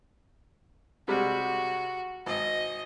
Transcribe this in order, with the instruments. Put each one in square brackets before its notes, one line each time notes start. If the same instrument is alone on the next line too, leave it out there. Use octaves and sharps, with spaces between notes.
[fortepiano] C3 G3 G#3 [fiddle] F#4
[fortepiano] G#1 [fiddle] D#5